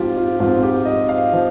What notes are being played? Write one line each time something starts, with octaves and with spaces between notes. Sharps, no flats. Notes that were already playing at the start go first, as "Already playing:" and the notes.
Already playing: G#2 F3 C4 F4 G4
F4
G#2 F3 C4 F4
G4
D#5
F5
F3 C4